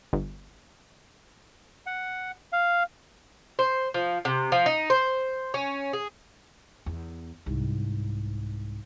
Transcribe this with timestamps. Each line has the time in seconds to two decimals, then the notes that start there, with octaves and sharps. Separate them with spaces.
0.13 G1
1.86 F#5
2.52 F5
3.59 C5
3.94 F3
4.25 C3
4.52 F3
4.66 D#4
4.90 C5
5.54 C#4
5.93 G#4
6.86 E2
7.46 C2 G#2